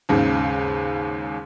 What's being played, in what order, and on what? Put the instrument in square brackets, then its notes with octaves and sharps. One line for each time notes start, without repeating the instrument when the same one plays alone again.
[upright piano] D#2 G#2 C#3